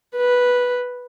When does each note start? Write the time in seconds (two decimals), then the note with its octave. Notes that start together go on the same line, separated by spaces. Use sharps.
0.16 B4